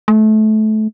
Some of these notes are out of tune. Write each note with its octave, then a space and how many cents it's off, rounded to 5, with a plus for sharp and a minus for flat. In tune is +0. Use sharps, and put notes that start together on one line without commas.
A3 -25